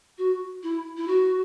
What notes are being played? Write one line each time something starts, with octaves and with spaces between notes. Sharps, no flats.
F#4
E4
E4
F#4